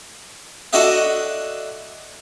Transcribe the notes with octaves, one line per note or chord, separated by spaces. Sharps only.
D4 F#4 A4 D#5 E5